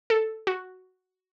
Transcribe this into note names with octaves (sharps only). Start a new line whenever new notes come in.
A4
F#4